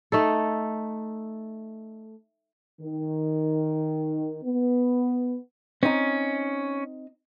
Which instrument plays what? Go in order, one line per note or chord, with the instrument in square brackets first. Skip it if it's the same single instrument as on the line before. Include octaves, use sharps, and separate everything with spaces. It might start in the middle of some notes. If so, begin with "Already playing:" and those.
[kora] A3 D#4 A4
[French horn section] D#3
B3
[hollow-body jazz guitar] C4 D#4 [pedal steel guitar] C#4